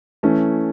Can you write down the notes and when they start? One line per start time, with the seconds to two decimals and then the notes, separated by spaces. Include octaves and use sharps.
0.23 E3 A3 C#4